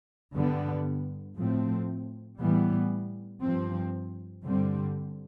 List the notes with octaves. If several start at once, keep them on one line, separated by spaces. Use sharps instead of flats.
G2 D3 G3 B3
A2 F3 A3 C4
A2 E3 G3 B3
G2 F3 C4
G2 D3 G3 C4